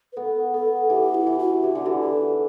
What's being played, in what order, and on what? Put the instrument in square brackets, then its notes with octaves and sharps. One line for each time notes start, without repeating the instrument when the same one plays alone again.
[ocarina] B4
[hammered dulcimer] B3 [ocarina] A4
[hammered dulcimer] B3 [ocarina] A4
[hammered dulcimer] E3 [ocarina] G4
[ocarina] E4
[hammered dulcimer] E3
[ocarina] F#4
[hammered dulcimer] E3 [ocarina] G4
[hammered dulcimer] D3
[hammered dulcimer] E3 [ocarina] F#4
[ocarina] G4
A4